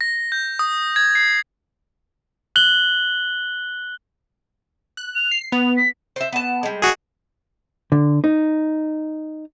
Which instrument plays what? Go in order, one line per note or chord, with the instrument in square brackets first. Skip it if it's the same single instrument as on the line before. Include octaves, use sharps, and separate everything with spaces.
[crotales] A#6
G6
D#6
G#6
C7
[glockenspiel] F#6 F#7 G7
[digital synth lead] F#6
[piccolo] F7
[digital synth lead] C7
[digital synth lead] B3 [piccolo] F7
[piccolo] B6
[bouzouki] C5 E5
B3 A5
G3 G#3
[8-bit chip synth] F#4 G#4
[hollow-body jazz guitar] D3
D#4